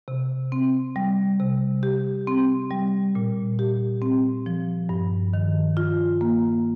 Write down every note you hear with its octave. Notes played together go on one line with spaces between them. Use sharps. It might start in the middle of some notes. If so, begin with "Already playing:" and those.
C3
C4
G3
C3
G4
C4
G3
A#2
G4
C4
F3
G2
D#3
F4
A#3